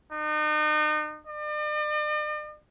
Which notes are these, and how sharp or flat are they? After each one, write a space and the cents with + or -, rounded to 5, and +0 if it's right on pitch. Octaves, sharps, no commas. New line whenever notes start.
D#4 -40
D5 +45